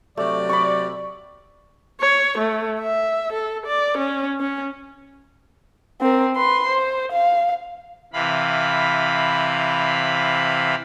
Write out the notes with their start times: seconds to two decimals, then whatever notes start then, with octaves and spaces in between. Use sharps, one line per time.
0.17 C3 F#3 A3 D5
0.49 B5 C#6
2.01 C#5
2.38 A3
2.81 E5
3.33 A4
3.67 D5
3.98 C#4
4.41 C#4
6.01 C4 A#4
6.36 B4 C6
6.68 C5
7.12 F5
8.13 C3 E3 F5 B5